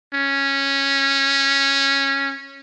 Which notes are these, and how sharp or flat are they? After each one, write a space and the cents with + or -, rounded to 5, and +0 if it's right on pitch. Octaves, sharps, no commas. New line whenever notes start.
C#4 -10